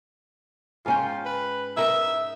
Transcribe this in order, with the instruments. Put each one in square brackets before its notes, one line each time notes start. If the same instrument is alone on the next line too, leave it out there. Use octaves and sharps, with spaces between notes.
[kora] G#2 C#4 G5 [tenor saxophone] F4
[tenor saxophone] B4
[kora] D#4 A#4 [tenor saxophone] E5